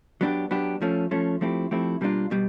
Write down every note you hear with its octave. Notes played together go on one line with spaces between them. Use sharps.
F#3 B3 D4 G4
F#3 B3 D4 G4
F3 A3 C#4
F3 A3 C#4
F3 A3 C4 E4 G4
F3 A3 C4 E4 G4
B2 G3 A#3 D4 F4
B2 G3